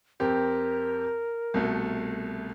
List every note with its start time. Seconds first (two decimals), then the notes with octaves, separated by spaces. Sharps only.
0.20 F2 C4 G4 A#4
1.54 C2 B2 A3